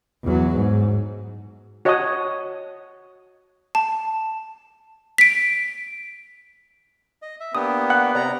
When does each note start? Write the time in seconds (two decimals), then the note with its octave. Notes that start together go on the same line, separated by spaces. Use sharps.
0.24 E2 F#3
0.55 G#2
1.85 F#4 C#5 D#5 F#5 A5 D#6
3.75 A5
5.18 B6 D7
7.22 D#5
7.40 E5
7.55 A#3 B3 D4 G4 D#6
7.90 F#5 F#6
8.15 C3 D5 A#5